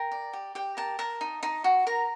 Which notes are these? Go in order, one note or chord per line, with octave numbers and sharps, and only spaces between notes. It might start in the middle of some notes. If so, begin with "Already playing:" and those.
Already playing: A#4 G5
D5
G4
G4 G5
A#4 A5
A#4 A5
D#4
D#4
F#4
A#4 A#5